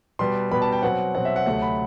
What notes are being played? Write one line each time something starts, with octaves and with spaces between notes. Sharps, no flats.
B2 G3 B3 C6
B2 G3 B3 B5
A5
G5
B2 F#3 C4 F#5
B2 F#3 C4 F#5
E5
F#5
D2 C3 F#3 A3 F#5
B5